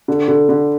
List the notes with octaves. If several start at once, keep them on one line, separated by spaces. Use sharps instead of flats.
D3
D3
D3